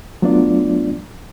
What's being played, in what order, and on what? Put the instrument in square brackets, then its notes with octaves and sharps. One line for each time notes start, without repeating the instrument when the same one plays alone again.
[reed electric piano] F#3 A3 B3 D4 F4 D5